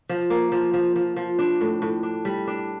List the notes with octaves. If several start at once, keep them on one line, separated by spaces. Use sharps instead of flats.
F3
A#3
F3
F3
F3
F3
D4
A2
A2
D4
G3
D4